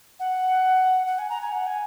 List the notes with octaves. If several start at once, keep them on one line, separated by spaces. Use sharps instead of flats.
F#5
F#5
G#5
A#5
G#5
F#5
G#5